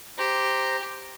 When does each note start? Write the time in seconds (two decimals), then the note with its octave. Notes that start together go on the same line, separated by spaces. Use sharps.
0.18 G4 C5 A#5